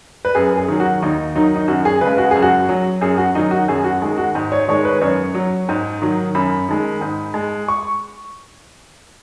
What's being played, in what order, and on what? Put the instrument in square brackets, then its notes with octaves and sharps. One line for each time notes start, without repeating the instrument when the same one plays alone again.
[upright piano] B4
F#2 G#4
G#4
D#3 F#3
F#4
D#2 D#4
D#3 F#3 D#4
D#4
F#2 F#4
G#4
C#3 B4
G#3
F#4
F#2 G#4
F#4
F#3
F#2 G#4
F#4
D#3 F#3 D#4
F#4
F#2 G#4
F#4
D#3 G#3
F#4
G#2
C#5
D#3 G#3 C#5
B4
F#2 C#5
F#3
G#2
D#3 F#3
F#2 B5
D#3 G#3
G#2
G#3
C#6